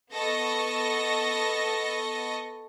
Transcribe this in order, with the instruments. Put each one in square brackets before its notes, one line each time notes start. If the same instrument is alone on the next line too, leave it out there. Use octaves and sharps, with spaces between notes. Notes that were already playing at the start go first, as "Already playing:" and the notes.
[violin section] B3 A4 D#5 C#6 A#6